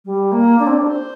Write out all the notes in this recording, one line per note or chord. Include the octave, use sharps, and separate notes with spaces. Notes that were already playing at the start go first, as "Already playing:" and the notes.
G3
A#3
D4
C4
D4
C5